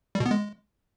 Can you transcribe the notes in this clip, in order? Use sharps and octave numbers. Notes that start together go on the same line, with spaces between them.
G3
B2
B3
G#3